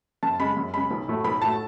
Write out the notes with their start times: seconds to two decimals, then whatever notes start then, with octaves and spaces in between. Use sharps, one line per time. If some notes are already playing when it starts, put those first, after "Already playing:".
0.23 F#2 A5
0.39 C#3 G#3 B5
0.57 F#2
0.74 C#3 G#3 B5
0.91 B1
1.08 A2 F#3 A3
1.24 B1 B5
1.41 A2 F#3 A3 A5